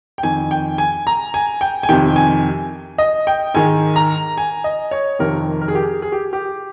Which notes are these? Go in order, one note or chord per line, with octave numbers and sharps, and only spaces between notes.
G5
F2 D#3 G#5
G5
G#5
A#5
G#5
G5
G#5
F2 C3 D#3 G5
G#5
D#5
G5
G#2 D#3 G#5
A#5
G#5
D#5
C#5
F2 C3 D#3 A#4
A#4
G#4
G4
G#4
G#4
G4
G4